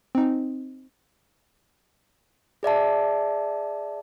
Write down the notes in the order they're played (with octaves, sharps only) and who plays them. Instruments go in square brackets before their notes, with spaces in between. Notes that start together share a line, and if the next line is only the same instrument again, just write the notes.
[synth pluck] C4 D#4
[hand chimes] G#4 D5 E5 A5